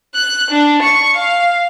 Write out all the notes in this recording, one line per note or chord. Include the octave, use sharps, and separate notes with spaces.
F#6
D4
C#6
F5